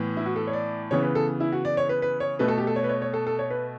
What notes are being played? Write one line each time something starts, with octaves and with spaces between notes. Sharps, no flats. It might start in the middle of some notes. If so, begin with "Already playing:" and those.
Already playing: A2 E3 B3
E4
F#4
A4
C#5
D5
C#3 E3 B3 C#5
B4
A4
E4
F#4
D5
C#5
B4
B4
C#5
B2 A3 B4
A4
G4
A4
C#5
B4
C#5
C#5
A4
A4
C#5
B4